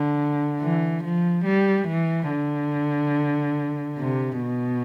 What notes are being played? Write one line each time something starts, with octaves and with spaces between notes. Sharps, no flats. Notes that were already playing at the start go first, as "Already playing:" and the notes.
Already playing: D3
E3
F3
G3
E3
D3
C3
B2